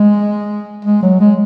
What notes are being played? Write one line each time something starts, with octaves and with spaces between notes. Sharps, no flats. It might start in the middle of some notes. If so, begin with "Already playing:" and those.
Already playing: G#3
G#3
F#3
G#3